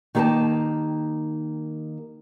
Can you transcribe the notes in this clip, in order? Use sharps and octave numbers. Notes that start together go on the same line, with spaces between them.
D#3 A#3 G4 B4 D#5 A5